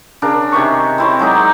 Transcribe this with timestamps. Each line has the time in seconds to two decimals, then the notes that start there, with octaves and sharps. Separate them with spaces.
0.22 C#3 D4 A#4
0.52 C3 D#3 E5 C#6
0.98 C4 E4 C#5
1.19 F#3 G#3 D#4 D5